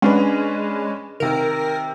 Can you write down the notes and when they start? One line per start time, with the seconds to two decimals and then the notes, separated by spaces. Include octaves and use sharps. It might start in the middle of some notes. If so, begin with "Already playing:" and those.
0.02 G#3 C#4 D4 B4
1.20 C3 D#3 A#4